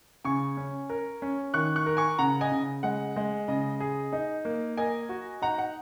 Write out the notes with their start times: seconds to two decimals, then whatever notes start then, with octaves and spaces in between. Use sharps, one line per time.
0.24 C#3 G#5 C#6
0.57 C#4
0.90 A#4
1.22 C#4
1.54 D#3 C#6 F#6
1.76 C#6 F#6
1.86 A#4
1.97 G#5 C#6
2.19 C#3 F#5 A#5
2.41 D#5 G#5
2.52 C#3
2.83 G#3 F#5
3.16 G#3
3.48 C#3 D#5
3.80 G#4
4.13 D#4
4.45 A#3
4.77 A#4 D#5 G#5
5.09 F#4
5.42 D#4 F#5 A#5
5.58 F#5